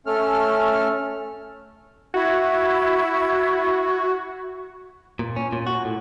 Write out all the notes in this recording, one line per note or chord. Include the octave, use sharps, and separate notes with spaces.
A3 C#4 A4 F6
E4 F#4 G#6
A#2
C#4
A#2
F#4
A2